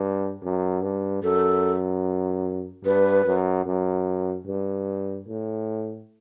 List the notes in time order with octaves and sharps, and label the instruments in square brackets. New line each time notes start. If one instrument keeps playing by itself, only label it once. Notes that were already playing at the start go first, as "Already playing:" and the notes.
Already playing: [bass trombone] G2
F#2
G2
[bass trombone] F#2 [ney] A4
[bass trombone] G2 [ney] B4
[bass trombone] F#2
F#2
G2
A2